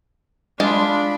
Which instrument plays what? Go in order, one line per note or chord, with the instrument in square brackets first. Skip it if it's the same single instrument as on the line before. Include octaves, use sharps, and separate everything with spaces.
[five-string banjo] G#3 F4 [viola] D4 B5